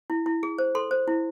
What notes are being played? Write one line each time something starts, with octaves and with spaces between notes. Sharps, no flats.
E4
E4
G#4
C5
A4 C6
C5
E4